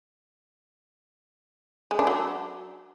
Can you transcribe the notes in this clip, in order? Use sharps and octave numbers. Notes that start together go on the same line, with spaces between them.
G#3
D4
F#3